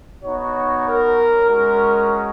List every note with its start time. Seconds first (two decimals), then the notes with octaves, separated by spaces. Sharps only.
0.23 B3 D#4 F#4 C#5
0.85 A#4
1.47 G#3 C#4 F#4 A#4